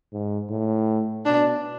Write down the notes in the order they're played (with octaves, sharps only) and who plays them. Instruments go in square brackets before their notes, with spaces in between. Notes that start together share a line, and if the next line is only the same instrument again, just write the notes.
[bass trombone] G#2
A2
[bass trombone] B2 [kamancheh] D4